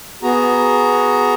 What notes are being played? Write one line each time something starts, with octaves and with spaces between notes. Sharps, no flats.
B3 F#4 G#4 A#5